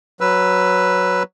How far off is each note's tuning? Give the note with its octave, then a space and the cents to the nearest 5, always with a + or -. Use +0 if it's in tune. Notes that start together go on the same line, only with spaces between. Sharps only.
F#3 +0 B4 +0 E6 +15